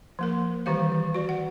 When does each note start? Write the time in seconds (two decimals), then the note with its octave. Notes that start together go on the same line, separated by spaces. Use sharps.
0.19 F3 A#3 A#4
0.66 D#3 E3 G3 G4 C5 F5
0.92 E3
1.15 F#4 D5
1.29 F#5